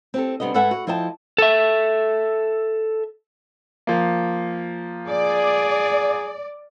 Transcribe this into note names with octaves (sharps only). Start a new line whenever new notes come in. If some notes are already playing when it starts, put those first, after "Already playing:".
C4 G4 A4
C3 G3 B3 D4 D#5
G#2 A4 B4 E5 F#5 G#5
F#4
F3 E4 D#5 G5 A5
A4 E5
F3 A#3
G#4 D5